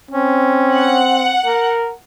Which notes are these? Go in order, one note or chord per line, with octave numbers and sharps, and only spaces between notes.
C4 C#4
F#5
A#4